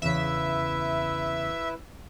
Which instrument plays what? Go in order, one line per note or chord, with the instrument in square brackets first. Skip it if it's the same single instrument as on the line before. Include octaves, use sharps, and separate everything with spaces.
[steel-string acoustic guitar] E2 C#3 [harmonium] E4 B4 [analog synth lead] E5